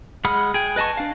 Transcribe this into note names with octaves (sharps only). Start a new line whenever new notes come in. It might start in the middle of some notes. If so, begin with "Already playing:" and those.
G#3 F#5 B5 D#6 F6
G#4 G5
B4 D#5 G#5 A5 C#6
D4 F5